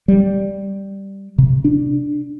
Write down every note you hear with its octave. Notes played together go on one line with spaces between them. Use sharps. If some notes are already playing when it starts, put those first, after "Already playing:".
G3
C3
D4